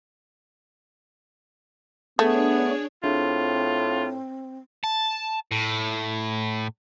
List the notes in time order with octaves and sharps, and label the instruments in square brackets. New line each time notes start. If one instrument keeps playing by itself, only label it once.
[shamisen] A3 [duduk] B3 [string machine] D4 C#5 [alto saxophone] G#4
[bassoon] A2 [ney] C4 [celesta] D4 G#4 E5 [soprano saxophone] F4
[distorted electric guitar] A5
A2